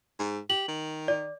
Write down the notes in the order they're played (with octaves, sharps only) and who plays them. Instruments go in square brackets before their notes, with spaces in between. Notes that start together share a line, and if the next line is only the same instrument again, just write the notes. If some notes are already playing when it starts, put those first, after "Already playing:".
[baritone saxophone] G#2
[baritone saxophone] G4 [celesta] F#7
[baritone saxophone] D#3
[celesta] D5